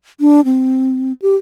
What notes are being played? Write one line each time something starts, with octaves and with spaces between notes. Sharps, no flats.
D4
C4
G4